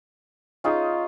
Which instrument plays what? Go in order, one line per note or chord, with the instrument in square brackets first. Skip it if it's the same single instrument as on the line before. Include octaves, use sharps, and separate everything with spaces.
[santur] C#4 D#4 G#4 [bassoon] F4